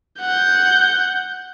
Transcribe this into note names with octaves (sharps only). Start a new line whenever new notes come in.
F#5 G6